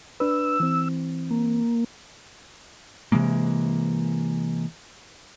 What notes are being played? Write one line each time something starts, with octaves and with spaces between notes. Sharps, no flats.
D4 B4 E6
E3 C4
A#3
C3 E3 G#3 A#3